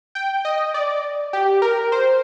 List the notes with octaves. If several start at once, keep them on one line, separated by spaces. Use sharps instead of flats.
G5
D#5
D5
G4
A#4
C5